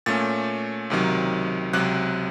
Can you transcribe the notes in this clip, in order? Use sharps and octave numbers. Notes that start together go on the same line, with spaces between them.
A#2 A3 C#4 A6
C#2 C3 D#3 F#3
C#2 C3 F#3 F#6